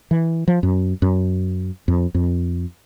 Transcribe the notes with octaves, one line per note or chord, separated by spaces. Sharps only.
E3
F3
F#2
F#2
F2
F2